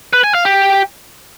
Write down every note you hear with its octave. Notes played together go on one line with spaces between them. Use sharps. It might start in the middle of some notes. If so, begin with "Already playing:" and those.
B4
G#5
F5
G4